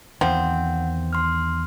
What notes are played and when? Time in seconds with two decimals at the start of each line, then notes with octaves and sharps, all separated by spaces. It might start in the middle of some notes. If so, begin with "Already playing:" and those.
0.21 E2 D#3 F3 C4 F#5
1.13 C6 F6